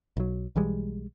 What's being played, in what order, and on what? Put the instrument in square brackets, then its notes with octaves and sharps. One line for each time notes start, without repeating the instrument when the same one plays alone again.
[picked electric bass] B1 F#3
B1 E3 G3 G#3